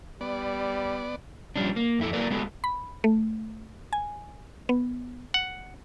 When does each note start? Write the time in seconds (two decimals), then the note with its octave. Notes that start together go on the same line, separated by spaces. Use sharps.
0.21 G3 B3 D5
1.56 F3 G3 C#4 D4
1.76 A#3
1.99 F2 E4 A4
2.13 F#3 A#3 A#4 B4 D5
2.30 G#3 B3 F#4 A4
2.64 B5
3.04 A3
3.93 G#5
4.69 B3
5.34 F#5